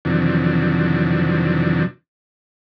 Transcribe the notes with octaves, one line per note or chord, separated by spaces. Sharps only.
F2 C3 D#3 E3 F#3 D4